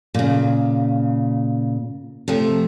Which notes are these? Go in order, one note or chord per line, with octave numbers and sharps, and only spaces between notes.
A#2 C#3
C3 F3 A3